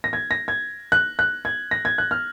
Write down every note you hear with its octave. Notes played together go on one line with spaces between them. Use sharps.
A#6
G#6
A#6
G#6
F#6
F#6
G#6
A#6
G#6
F#6
F6